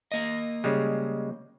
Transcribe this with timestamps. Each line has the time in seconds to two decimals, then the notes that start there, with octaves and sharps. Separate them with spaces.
0.12 A#3 D#5
0.64 C#3 G3 G#3